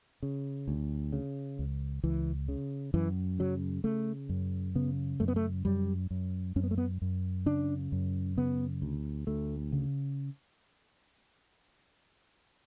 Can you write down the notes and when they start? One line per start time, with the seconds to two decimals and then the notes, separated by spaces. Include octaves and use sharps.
0.23 C#3
0.68 D2
1.12 C#3
1.59 C#2
2.03 C#2 E3
2.48 C#3
2.94 F#2 E3
3.39 C#3 F#3
3.84 C#3 A3
4.29 F#2
4.75 C#3 B3
5.20 F#2 A3
5.28 B3
5.36 A3
5.65 F#2 G3
6.11 F#2
6.56 F#2 C#4
6.64 B3
6.71 A3
6.78 B3
7.02 F#2
7.46 C#3 D4
7.92 F#2
8.37 C#3 B3
8.82 D2
9.27 D2 A3
9.72 C#3